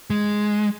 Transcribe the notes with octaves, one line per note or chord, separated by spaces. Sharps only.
G#3